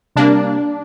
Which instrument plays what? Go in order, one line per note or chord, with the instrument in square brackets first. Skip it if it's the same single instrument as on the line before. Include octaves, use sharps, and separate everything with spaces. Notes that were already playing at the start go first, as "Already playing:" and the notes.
[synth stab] C3 G3 A#3 D4